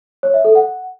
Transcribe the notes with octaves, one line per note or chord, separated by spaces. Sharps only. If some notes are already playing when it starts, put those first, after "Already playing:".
C#5
E5
A4
F#5